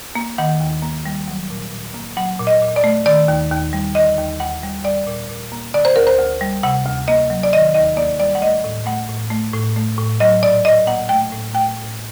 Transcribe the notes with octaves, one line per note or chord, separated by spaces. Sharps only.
A#3
D#3 F#5
D#2
A#3
G3
F#3
A#2
A#2
A#3
F#3 F#5
A#2
D#5
A#2
D5
A3
D#3 D5
D#2
D#2
G3
D3 D#5
D#2
D#2 F#5
G3
G3 D5
A#2
A#2
A#3
D3 D5
C5
D2 A#4
C5
D2
G3
C3 F#5
D2
A#3 D#5
F#3
D5
D#3 D#5
D#2 D#5
A#3 D5
G3 D5
F#5
A3 D#5
A2
A3 F#5
A2
A3
A2
A3
A2
F#3 D#5
A#2 D5
A#2 D#5
A#3 F#5
A3 G5
A2
A3 G5
A2